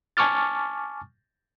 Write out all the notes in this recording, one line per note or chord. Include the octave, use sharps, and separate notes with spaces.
G#5 A5 C#6 D6 F6 A6